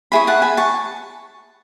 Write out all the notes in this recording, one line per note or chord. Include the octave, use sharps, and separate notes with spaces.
E4 G#4 C#5 G#5 B5
F#5 A5
G#5 B5
A5 C#6